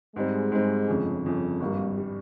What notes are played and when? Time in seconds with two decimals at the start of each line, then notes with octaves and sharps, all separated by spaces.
0.16 G#2 G3 G#3 C4
0.52 G#2 G3 C4
0.88 G1 F2 C#3
1.25 G1 F2 C#3
1.60 G#1 G2 G3 A#3
1.97 G3